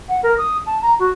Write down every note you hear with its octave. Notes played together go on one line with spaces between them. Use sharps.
F#5
A#4
D#6
A5
A#5
F#4